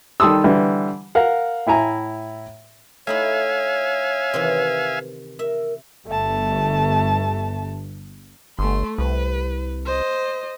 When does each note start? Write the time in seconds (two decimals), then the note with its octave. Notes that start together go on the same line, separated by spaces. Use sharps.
0.20 D#3 G3 A4 C6 D#6 E6
0.44 D3 E3 G3
1.15 A#4 F5 F#5
1.67 A2 E4 G#5 A#5
3.07 A3 D#4 E4 C#5 E5 F5 G#5
4.33 C3 D#3 E3
5.39 A#4 E5
6.08 G1 A3 A5
8.59 G1 A3 C6
8.98 C2 B4
9.86 C5 D#5